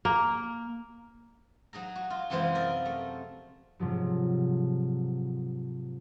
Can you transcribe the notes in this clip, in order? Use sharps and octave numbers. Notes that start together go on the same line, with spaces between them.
A#3
F#3 D#4 G#4 A#5
F#4
F4
F#2 C3 E3 F3 G#3 C5
A#4 D5 D#5
A3
G#2 C3 F3 F#3